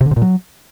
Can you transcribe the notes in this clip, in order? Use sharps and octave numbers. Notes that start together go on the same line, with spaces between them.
C3
D3
C3
A#2
F#3